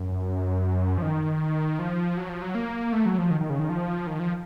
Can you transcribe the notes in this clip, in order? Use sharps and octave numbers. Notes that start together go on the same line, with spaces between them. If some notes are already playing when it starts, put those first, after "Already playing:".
Already playing: F#2
F3
D#3
F3
F#3
F3
F#3
A#3
A3
F#3
F3
D#3
D#3
C#3
D#3
F3
D#3
F3